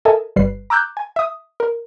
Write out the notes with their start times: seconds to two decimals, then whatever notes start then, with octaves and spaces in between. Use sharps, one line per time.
0.05 A4 A#4 D#5 E5 G#5 A5
0.36 G1 G3 B4 C7
0.70 A#5 D6 E6 F#6 G6
0.97 G#5
1.16 E5 D#6
1.60 A#4